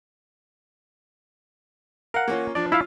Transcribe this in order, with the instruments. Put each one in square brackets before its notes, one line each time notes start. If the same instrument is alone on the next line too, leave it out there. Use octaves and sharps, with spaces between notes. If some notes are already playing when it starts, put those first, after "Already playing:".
[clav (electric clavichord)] A#4 F#5 [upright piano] F5
[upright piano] A#3 C#4 F4
[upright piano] F3 D4 [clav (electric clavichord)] D5
[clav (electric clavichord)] E4 E5 F5 [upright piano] F4